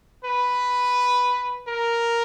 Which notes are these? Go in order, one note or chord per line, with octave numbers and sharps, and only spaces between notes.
B4
A#4